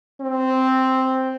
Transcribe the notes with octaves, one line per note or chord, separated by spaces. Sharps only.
C4